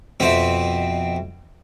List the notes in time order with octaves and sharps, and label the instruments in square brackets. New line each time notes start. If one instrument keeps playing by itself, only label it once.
[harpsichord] F2 B2 C4 E5